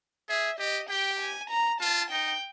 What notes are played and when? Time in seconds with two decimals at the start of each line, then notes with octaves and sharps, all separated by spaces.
0.29 G#4 E5
0.59 G4 D#5
0.90 G4 G5
1.20 G#5
1.50 A#5
1.81 F4 A5
2.11 D#4 G5